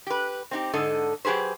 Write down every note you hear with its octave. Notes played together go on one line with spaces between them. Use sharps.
G4 B4
C4 D#4 G4
G#2 D3 A4 D#5
F#3 G4 G#4 B4 C5